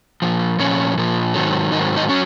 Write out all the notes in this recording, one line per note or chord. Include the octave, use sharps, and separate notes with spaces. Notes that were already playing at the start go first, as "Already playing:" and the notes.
A#2 F3
A#2 F3 C#4 C#5
A#2 F3
G#2 D#3 F#3
G#2 D#3 F#3 D#4 D#5
D#4 D#5
F#3 C#4 C#5